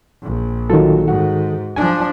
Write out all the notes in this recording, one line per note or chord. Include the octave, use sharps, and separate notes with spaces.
A#1
D#3 F3 F#3 A4
G#2 F#4
F3 D4 G#5